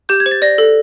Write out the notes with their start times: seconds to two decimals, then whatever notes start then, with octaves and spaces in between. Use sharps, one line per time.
0.09 G4 G6
0.20 G#6
0.26 C5
0.31 A6
0.42 D5 A#6
0.58 A4